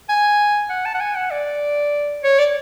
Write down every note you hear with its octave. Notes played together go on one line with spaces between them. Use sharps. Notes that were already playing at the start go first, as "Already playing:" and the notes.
G#5
F#5
A5
F#5
G#5
F#5
D5
C#5
D5